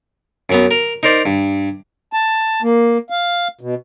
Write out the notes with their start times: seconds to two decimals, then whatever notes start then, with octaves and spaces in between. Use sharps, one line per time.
0.49 F#2 F#3 B3
0.71 A#4
1.03 D#4 A#4 C5 D5
1.26 G2
2.13 A5
2.62 A#3
3.10 F5
3.61 B2